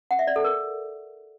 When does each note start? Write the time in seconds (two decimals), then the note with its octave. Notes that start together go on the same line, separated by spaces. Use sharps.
0.11 F#5
0.19 E5
0.27 D5
0.36 A4
0.44 A#4